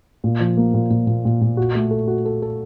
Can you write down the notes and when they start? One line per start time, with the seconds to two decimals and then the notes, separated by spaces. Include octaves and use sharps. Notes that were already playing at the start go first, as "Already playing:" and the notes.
0.24 A#2
0.40 F3
0.57 A#3
0.74 A#2
0.90 A#2
1.07 A#2
1.25 A#2
1.41 A#2
1.57 F#4
1.75 A3
1.91 A4
2.08 F#4
2.25 A4
2.42 A4